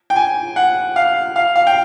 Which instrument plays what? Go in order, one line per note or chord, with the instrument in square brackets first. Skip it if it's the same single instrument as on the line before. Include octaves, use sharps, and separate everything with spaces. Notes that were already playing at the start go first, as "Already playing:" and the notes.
[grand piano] G5
G#5
F#5
F5
F5
F5
G5